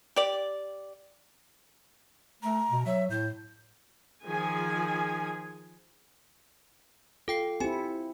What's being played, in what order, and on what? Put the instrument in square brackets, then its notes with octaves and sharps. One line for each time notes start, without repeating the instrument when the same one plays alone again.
[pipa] G4 D5
[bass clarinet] A3 [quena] A#5
[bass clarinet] B2
[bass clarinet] F#3 [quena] E5
[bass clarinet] A2 [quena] G6
[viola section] D#3 F3 G#4 G#5
[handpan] F4 [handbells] A4 G5 C7
[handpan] C4 E4 [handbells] G4 G#5